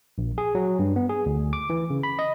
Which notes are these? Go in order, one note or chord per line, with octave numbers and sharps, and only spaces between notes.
A#1
G#4
F#3
G2
B3
G#4
D2
D6
E3
C#3
B5
D#5